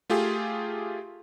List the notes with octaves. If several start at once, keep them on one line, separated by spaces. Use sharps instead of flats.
A3 F4 G4 G#4